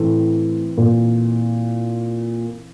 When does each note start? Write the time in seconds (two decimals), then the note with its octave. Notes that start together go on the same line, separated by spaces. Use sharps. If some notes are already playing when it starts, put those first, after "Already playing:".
Already playing: A2 E3 C4 E4 A4
0.78 A#2